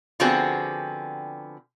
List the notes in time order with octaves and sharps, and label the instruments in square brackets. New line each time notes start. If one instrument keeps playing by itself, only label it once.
[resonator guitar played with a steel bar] D3 F3 B3 C4 F#4 G#4